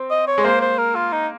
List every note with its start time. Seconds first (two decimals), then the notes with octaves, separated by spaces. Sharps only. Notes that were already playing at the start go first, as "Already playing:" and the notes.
Already playing: C4
0.10 D#5
0.27 C#5
0.38 G#3
0.44 A#3 C5
0.61 C5
0.78 A#4
0.96 F4
1.12 D#4